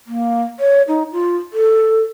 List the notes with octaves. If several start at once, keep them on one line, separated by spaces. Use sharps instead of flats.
A#3
C#5
D#4
F4
A4